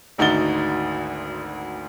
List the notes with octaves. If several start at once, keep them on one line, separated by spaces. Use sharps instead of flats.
G#1 D2 D#4 F#4 A6 G7